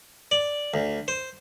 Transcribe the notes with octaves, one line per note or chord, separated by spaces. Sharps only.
D5
D2
C5